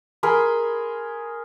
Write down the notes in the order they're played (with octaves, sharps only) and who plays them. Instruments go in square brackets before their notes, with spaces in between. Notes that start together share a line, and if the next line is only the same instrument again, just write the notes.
[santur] G#4 A#4 B5 C6